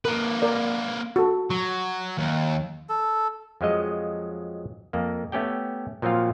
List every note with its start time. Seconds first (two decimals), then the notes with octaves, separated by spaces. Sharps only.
0.05 A#3 A#4 B4
0.42 A#4 D5
1.16 F#4 A4
1.50 F#3
2.17 D#2
2.89 A4
3.61 F2 F3 F#3 G#3 D#5
4.93 F2 A#3
5.32 A3 B3 C#4 G4 G5
6.02 A#2 F3 F#3 C4 F4 F5